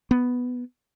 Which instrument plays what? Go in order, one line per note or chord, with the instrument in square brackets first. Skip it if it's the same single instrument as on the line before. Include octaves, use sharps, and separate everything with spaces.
[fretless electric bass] B3